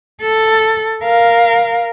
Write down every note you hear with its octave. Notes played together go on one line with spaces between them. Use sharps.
A4
A#4 F5